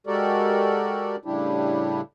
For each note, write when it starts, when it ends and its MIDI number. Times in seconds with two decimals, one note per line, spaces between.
0.07 1.16 56
0.07 1.16 66
0.07 1.16 67
0.07 1.16 69
0.07 1.16 70
0.07 1.16 74
1.25 2.01 45
1.25 2.01 49
1.25 2.01 55
1.25 2.01 62
1.25 2.01 64
1.25 2.01 67